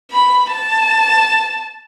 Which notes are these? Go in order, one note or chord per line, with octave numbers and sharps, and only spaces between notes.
B5
A5